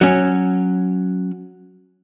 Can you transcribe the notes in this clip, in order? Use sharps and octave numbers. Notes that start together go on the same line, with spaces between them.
F#3 C#4